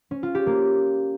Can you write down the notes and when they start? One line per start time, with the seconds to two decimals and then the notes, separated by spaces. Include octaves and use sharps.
0.11 C#4
0.23 F4
0.35 G4
0.47 A#3